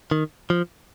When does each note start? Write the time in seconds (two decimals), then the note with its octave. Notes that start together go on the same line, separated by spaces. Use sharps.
0.11 D#3
0.50 F3